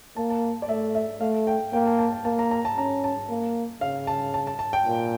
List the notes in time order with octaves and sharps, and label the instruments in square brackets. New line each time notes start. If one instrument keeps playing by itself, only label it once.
[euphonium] A#3 [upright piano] A5
[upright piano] A5
D5
[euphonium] A3 [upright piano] E5
[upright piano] E5
[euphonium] A3 [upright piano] F5
[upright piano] G5
[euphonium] A#3 [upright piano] G5
[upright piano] A5
A5
A5
[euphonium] A#3 [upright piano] A5
[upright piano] A#5
A#5
A5
[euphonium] C#4 [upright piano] A#5
[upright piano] A5
[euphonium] A#3
[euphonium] C#3 [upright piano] F5
[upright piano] A5
A5
A5
A5
G5
[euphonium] A#2